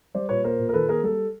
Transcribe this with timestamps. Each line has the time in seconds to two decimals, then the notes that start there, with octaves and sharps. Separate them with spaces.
0.14 G3 C5 D5
0.29 A#2 B4 C#5
0.44 A#3 A#4 C5
0.59 A#2
0.69 A#4
0.73 D#3 A4 B4
0.88 A#3 G#4 A#4
1.03 G3 A4